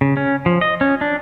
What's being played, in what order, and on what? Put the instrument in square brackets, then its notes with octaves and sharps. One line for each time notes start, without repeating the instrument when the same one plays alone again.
[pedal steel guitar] C#3
C#4
F3
D#5
C#4
D4